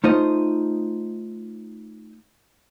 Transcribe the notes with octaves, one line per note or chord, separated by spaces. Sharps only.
A3 D#4 F4 C5 D#5